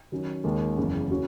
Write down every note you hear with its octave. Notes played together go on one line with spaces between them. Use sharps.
D#3 F#3 C#4
D#2 D#3 G#3
F#1 E2 C#3
F#3 C#4 F#4